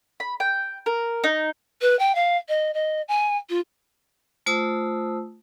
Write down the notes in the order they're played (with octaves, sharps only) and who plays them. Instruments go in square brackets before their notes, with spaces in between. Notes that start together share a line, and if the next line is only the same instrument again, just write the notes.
[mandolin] B5
G5
A#4
D#4
[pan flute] B4
G5
F5
D#5
D#5
G#5
F4
[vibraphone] A3 F4 C5 A5 D#6 E6